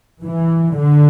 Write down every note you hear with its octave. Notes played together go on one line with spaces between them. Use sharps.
E3
D3